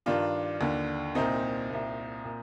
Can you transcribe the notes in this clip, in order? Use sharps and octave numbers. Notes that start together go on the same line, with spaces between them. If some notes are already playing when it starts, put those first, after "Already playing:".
G2 D#3 D4 F4
D#2 D3
C2 A#2 C4 D#4
C2 A#2
A#2